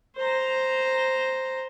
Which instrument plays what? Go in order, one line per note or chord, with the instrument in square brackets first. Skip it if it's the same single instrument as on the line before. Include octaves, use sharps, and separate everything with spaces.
[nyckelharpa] C5 A#5